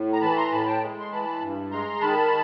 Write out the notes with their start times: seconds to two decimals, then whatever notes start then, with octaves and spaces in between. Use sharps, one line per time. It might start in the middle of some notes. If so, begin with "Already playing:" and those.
Already playing: A2
0.13 A#5
0.22 E3 A5 B5
0.37 A#5 C6
0.51 A2 A5 B5
0.66 G5 A5
0.81 G#3
1.00 C6
1.11 E3 A5 B5
1.41 G2
1.71 G#3 A#5 C6
2.01 D#3 A5 B5